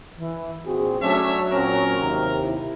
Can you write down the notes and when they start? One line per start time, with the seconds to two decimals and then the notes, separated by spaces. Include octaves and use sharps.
0.17 E3
0.65 A#1 C4 F#4 G#4
1.01 F#3 A3 C#4 D4 C#5 E5
1.52 A#2 C4 C#4 A#4
1.98 D#2 C3
2.40 E4